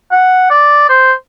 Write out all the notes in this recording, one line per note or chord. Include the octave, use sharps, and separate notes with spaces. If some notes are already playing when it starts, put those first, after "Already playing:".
F#5
D5
C5